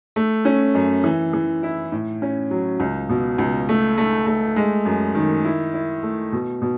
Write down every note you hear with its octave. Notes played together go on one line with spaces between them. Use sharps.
A3
C#4
F#2
E3
E3
E4
A2
C#4
F#3
C#2
B2
C#2
A3
A3
A3
G#3
F#2
D#3
E4
E4
A3
B2
B2